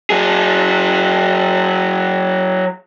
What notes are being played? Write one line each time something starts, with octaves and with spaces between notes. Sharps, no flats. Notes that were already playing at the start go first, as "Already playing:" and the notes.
F#3 G#4